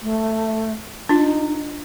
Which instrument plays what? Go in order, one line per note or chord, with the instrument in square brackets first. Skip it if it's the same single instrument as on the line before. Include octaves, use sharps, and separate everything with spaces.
[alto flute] A3
[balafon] D4 F4 [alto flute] D#4